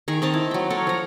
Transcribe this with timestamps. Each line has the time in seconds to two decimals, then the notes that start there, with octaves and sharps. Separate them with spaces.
0.08 D#3 G#4 A#5 C#6
0.22 C4 D#5 A5 A#5
0.34 E4
0.51 F#3 G5
0.70 A4 A#4 C#5
0.87 F3 A#5